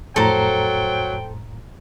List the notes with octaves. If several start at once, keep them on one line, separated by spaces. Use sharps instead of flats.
F2 A2 F#3 A4 C5 G5 A#5